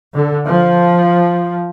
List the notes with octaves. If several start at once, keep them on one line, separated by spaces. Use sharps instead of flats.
D3
F3